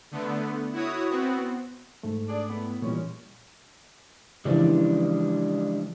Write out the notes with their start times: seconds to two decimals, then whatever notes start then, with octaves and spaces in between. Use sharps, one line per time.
0.11 D3 A3 B3
0.73 E4 F#4 C#5 D#6
1.10 B3 C4 F#4
2.03 G#2 A3
2.29 D4 G#4 D5
2.49 A2 B3
2.82 A#2 E3 G3 G#3 C#4
4.45 C#3 E3 F3 G3 G#3 D4